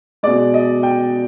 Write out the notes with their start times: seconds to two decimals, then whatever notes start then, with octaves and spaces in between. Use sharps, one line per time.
0.23 B2 G#3 D5
0.54 D#5
0.83 G5